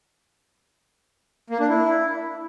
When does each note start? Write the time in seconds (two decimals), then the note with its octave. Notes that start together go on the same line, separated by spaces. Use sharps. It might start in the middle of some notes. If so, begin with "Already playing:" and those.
1.50 A#3
1.60 D4
1.69 E4